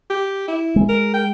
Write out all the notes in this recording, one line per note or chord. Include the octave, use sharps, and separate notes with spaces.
G4
E4
G#3
A#4
G5